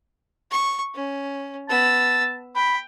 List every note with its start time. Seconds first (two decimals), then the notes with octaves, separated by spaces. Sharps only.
0.51 C#6
0.95 C#4
1.69 B3 A5 E6
2.55 G5 B5